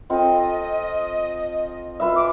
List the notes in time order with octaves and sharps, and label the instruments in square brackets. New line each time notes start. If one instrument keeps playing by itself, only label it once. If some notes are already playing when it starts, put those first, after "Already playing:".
[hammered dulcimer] C4 F4 A4 [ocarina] D#5
[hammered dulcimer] F4 B4 E5
[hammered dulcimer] G#4 [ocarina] D6